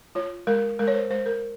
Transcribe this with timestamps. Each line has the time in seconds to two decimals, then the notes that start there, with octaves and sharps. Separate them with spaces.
0.15 F4 C#5
0.47 G#3 A#4
0.79 G#3 A#4
0.88 C#5
0.94 C5
1.10 G#3 C5
1.26 A#4